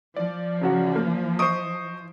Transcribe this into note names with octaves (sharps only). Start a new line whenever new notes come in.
F3 D5
C#3 F#3 F#4
A#3
C5 D#5 C#6 D#6 D7